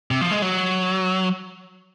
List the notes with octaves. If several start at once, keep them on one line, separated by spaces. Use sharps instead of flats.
C3
F3
G#3
F#3